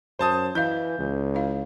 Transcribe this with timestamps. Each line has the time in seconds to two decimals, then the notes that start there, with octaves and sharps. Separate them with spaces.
0.19 F#2 C5 A5 D#6
0.55 E3 E4 D#5 F5 G6
0.99 C#2
1.35 E4 F5